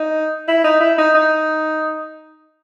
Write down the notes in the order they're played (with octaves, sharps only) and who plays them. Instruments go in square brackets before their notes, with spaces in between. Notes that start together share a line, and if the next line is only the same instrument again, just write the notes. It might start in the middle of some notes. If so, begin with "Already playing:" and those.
Already playing: [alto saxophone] D#4
E4
D#4
E4
D#4
D#4